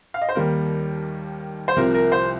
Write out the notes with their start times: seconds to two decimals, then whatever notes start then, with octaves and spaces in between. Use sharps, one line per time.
0.14 F5
0.22 D#5
0.29 C5
0.35 D#2 D#3 G3 A#3 A#4
1.68 C5
1.76 C2 C3 F3 A#4
1.94 A#4
2.12 C5